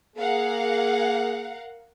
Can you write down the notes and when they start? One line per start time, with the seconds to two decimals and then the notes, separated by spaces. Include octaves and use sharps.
0.16 A#3 G#4 A#4 F5 F#5